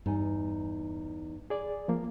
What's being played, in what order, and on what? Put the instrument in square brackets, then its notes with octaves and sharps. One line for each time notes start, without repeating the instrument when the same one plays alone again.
[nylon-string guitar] E2 D#4 G#5 [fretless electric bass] G2
[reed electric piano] G#4 D5
F3 A#3